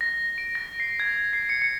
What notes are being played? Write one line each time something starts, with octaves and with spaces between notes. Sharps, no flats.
A#6
D7
A#6
C7
G#6
C7
C#7
C#7